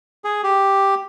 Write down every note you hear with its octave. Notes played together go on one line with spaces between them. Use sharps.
G#4
G4